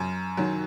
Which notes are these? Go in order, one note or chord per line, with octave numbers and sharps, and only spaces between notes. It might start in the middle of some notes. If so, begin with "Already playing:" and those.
Already playing: F#2
D#3 F#3